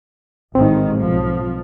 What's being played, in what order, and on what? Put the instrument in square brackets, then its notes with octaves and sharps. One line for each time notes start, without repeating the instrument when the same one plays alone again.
[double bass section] A1 G#2 D#3 [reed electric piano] C4
[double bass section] B1 F3